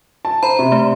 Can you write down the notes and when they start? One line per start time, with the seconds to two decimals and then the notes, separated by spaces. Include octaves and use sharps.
0.25 A5
0.43 C5 A#5 B5
0.59 C3
0.72 A3